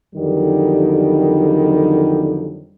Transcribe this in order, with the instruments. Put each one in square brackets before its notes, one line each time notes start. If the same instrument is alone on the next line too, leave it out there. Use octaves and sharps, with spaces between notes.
[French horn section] F2 D3 D#3 F#3 G3